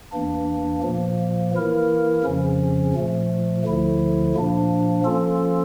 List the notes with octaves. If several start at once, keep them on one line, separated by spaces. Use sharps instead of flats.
E2 E3 A#3 D4
A#2 F3 A#3
E3 A#3 E4 A#4
F2 C#3 F3 C#4
A#2 F3 A3
D2 D3 F3 A3 E4
A#2 F3 A#3 D4
F3 A#3 C#4 F4 A4